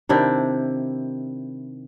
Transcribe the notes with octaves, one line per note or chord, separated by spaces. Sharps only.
C3 D#3 D4 E4